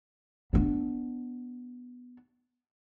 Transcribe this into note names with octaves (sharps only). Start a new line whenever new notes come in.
B3 D4